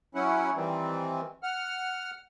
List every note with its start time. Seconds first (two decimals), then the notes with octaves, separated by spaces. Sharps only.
0.15 F#3 C#4 E4 F#5
0.56 D#3 E3 G3 C4
1.43 F#5 F6